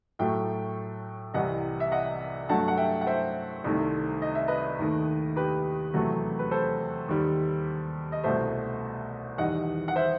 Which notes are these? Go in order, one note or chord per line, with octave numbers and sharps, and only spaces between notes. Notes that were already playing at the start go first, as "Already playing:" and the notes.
A2 F#3 A3 E5 G5
C2 C3 E3 G3 D#5 F#5
E5
D#5 F#5
G2 F#3 A3 F#5 A5
F#5
E5 G5
F#5
C5 E5
C2 C3 D#3 A3
D#5
E5
B4 D#5
D#2 D#3 A3
G4 B4
E2 C3 F#3 A3
B4
A4 C5
D#2 D#3 G3
D#5
C2 B2 A3 C5 E5
E2 D#3 G3 D#5 F#5
F#5
C5 E5